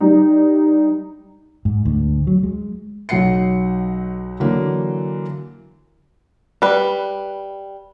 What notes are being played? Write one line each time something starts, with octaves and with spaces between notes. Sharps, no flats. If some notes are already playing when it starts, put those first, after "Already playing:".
G3 D#4
G#2
D2
F#3
G#3
B1 F#3 F#5 C7 C#7
D3 E3 F#3 A#3
G3 B4